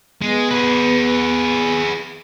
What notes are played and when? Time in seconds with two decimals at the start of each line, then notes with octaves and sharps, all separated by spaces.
0.22 G#3 B3
0.51 G#4 B4